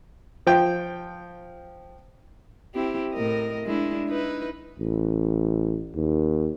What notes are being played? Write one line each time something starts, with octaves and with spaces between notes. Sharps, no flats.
F3 G5
C4 E4 G4
A2 A#4 D#5
G#3 D4 E4
D#4 E4 B4
A1
D#2